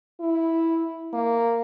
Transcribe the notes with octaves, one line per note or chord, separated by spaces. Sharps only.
E4
A#3